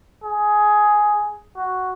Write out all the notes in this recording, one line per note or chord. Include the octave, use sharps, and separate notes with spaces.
G#4
F#4